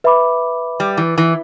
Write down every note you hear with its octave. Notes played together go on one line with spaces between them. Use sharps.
B4 E5 B5 D6
G3
E3
E3